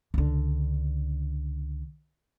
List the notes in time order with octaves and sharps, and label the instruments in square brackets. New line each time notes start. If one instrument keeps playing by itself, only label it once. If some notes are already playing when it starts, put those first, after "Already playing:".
[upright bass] C#2 D3